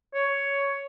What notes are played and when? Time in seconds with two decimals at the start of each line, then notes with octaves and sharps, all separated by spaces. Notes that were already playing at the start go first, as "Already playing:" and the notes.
0.14 C#5